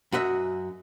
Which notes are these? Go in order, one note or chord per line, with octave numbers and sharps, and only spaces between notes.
F#2 F#4 D#5 E5